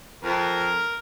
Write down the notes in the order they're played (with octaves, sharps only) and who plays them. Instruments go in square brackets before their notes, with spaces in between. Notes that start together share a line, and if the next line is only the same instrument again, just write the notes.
[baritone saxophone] F2 [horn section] A#4